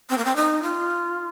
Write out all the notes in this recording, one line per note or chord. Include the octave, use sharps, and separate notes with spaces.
C4
A#3
C4
D#4
F4